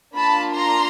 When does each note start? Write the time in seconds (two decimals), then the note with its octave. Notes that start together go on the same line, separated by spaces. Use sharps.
0.16 A#3 D4 F4 A5 B5
0.54 A#5 C6